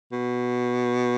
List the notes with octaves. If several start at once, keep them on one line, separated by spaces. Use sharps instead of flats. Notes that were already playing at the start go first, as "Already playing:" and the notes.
B2